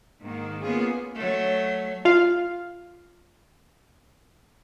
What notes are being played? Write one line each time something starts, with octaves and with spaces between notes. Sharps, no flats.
G#2 D#3 A#3
A#3 B3 C#4 F4 G#4
F#3 A3
F4 F5